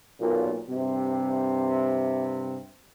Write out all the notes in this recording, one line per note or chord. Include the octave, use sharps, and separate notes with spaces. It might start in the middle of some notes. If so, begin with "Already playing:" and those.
B1 A#2
G2 C3